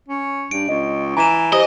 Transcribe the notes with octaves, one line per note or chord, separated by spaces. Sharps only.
C#4
G2 D7
C#2 D#5
E3 G#5 A#5 E7
G4 C5 D#5